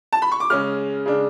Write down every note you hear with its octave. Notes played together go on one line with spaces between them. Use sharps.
A5
B5
C#6
D6
C#3 G#3 C#4 F6
C#3 G#3 D4